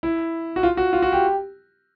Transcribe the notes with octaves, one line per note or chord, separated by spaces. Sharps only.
E4
F#4
F4
F#4
F4
F#4
G4